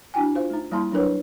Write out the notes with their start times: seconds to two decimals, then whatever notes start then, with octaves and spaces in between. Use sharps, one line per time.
0.14 D4 E4 F#4 G5 G#5
0.35 F4 C5 F5
0.50 A3 D#4
0.72 G3 A#3 E4 A5 C6
0.91 F#3 D4 E4 A#4 B4 C#5